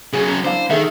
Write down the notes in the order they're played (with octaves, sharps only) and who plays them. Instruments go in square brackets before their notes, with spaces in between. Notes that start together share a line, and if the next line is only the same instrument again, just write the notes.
[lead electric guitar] C#3 F#3 [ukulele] G#4
[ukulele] C#4 A#5
[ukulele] D4 E4 F5 [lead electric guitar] C5
[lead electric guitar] D#3 [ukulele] G#4 A4 E5